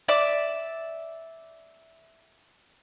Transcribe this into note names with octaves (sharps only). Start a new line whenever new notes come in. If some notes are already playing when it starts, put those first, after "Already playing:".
D5 E5 D6